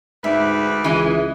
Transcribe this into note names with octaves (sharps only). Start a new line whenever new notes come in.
D2 G#2 B4 D5 E5
C#2 E3 G#3